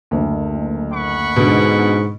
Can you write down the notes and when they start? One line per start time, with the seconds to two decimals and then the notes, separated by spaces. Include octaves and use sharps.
0.11 F#1 D2
0.93 F#5 B5 C#6
1.36 G#2 B2 D3